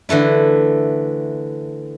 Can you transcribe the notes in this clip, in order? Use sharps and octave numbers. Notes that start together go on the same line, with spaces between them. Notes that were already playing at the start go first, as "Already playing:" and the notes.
D3 E3 A3 E4